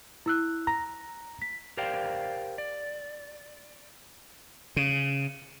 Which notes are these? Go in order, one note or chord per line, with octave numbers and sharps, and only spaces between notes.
E4 E6 F#6
A#5 A#6
B6
G4 A#4 C5 D5 F5 G5
D5
C#3